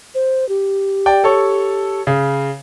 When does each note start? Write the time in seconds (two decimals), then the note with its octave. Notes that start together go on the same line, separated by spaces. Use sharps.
0.15 C5
0.49 G4
1.06 D5 G5
1.24 A4 C#5
2.07 C#3